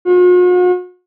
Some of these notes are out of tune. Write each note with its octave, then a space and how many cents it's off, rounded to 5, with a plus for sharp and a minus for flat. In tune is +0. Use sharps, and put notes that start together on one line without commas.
F#4 -45